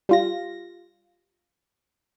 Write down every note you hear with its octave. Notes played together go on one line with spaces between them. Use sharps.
G3 F4 A#6